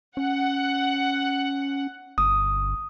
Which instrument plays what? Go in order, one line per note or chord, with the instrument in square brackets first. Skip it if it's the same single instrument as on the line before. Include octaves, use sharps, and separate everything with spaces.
[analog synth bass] C#4 [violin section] F#5
[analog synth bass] G1 [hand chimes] D#6